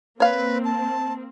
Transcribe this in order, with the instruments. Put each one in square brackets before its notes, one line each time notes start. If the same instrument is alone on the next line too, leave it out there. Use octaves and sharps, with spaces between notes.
[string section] A#3 C4 [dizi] B4 [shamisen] C#5 F5
[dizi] A5